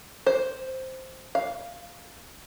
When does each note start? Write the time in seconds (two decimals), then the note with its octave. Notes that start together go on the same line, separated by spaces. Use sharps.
0.27 C5
1.35 F5